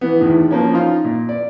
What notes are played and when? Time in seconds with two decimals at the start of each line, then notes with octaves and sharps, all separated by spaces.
0.01 E3 B3
0.20 E2 A2 D#3
0.51 F3 A#3 C#4
0.73 D#4 F4
1.04 A#2
1.29 D5